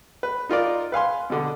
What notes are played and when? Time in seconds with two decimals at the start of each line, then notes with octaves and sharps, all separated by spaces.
0.23 B4
0.49 D#4 F4 A#4 D5
0.92 B4 F5 G#5 C6
1.30 B2 D3